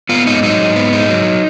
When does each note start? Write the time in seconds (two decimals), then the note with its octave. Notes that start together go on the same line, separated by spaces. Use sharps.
0.09 B3 F4
0.26 G#2 D#4
0.43 F#3 D#4
0.59 G#2
0.76 B3
0.93 G#2 D#4
1.09 F#3